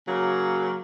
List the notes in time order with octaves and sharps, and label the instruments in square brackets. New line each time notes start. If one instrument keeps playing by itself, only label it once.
[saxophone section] C#3 F#3 A#3